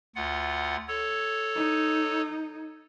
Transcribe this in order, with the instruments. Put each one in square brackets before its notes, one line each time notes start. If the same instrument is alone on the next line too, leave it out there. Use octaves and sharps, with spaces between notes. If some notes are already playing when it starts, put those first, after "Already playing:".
[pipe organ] D2 F4 F#5
A4 C#5
[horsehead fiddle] D#4